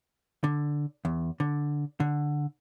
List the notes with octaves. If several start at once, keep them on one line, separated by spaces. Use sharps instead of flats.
D3
E2
D3
D3